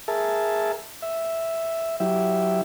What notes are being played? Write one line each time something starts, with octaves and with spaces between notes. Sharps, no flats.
G#4 A#4 E5 A5
E5
F#3 E4 G4 E5